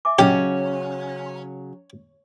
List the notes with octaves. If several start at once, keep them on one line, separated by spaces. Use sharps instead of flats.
E5 G#5 D6
C#3 F#3 C#4 G4 C#5 D#5 G5